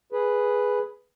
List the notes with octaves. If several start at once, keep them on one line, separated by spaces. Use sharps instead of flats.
G#4 B4